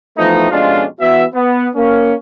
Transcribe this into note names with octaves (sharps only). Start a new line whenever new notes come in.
E3 F3 A3 B3 D#4
F2 B2 G#3 C#4 D4 F4
E3 B3 F#4 E5
B3
A#3 C#4